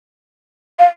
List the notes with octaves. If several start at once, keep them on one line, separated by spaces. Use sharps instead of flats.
F5